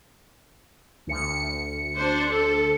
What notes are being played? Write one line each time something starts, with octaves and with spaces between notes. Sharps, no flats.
D2 C#7
D4 C5
A4